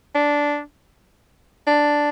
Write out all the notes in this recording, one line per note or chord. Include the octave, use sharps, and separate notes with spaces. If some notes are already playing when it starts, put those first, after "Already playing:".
D4
D4